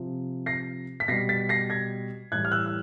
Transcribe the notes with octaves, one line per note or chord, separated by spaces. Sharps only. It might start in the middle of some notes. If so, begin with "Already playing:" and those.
Already playing: C3 F3
A#6 C7
B6
B2 G3 A#6 C7
A6 B6
A#6 C7
G#6 A#6
A2 E3 G3 F#6 G#6
F6
E6 F#6
E6